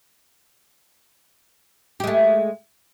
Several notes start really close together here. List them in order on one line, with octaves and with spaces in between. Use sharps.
G4 G#3 A3